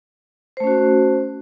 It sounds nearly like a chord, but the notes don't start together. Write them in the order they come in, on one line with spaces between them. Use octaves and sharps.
C5 A3 C#4 F#4